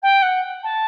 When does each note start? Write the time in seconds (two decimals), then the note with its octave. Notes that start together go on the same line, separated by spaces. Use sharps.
0.02 G5
0.22 F#5
0.63 A5